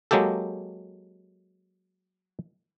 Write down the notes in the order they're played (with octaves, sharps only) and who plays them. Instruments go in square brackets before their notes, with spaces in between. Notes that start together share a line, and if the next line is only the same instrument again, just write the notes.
[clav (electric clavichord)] F#3 G#3 A#3 G4 A4